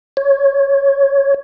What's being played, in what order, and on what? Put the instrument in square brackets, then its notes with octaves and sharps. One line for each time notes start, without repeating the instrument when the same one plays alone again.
[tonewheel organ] C#5